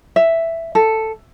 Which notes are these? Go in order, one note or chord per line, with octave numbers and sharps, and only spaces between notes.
E5
A4